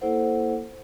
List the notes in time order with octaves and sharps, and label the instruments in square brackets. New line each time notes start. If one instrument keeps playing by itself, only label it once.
[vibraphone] A#3 E4 A4 C5 F#5